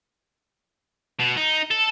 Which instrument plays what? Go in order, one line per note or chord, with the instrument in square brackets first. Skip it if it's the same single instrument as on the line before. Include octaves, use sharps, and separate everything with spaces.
[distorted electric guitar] B2
D#4
A4